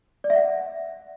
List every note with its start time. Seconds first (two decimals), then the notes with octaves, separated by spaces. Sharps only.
0.24 D5
0.30 E5
0.36 F#5